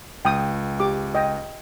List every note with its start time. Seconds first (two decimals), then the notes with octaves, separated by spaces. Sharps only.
0.25 C#2 G5 D#6
0.80 G4 D6
1.15 D#5 G5